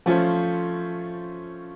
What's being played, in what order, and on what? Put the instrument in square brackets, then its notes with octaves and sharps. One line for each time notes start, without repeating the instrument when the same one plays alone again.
[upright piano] F3 [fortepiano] A3 C#4 F4 C5